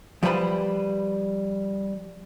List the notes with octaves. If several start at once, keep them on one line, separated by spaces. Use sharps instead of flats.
F3 G3 B4 C5 G5 B5